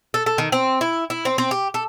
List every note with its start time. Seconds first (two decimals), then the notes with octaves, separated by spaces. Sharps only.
0.14 A4
0.26 A4
0.38 D#3
0.52 C4
0.81 E4
1.10 E4
1.25 C4
1.38 C4
1.51 G4
1.74 A4